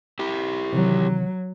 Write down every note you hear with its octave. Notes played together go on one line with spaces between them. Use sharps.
E4 G4
C3 D#3 E3 F#3